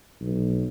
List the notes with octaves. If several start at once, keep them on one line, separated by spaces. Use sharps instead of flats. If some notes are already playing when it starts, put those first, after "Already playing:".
B1